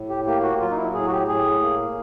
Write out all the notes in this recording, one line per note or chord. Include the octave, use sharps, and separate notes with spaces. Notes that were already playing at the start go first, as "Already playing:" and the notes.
Already playing: A2
G4
A#3 G4
F#4
F#3 F4
D#4
E4
A2 G#4
F#4
G4
A2 G#4
A#3